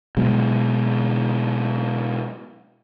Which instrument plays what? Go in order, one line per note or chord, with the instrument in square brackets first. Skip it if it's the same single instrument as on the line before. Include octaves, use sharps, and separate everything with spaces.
[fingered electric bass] B2 F#3 G#3